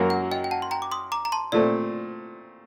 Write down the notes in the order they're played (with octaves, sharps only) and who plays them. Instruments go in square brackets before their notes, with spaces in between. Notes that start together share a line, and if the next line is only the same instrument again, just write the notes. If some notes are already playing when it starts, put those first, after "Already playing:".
Already playing: [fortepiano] F#2 F#3 A#3 F#4 A#4
[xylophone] F#5
D#5 G5
G5
F#5 A5
C6
G5 A#5
D6
C6 D#6
A#5 D6
A#5
A5 C6
[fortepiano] A#2 A3 C4 [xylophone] D5